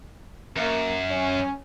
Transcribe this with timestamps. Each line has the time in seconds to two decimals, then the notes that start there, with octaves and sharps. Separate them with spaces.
0.57 F#2 A#3
1.11 C#4